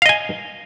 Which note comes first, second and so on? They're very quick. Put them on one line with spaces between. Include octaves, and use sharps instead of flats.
F5 D#5 G#5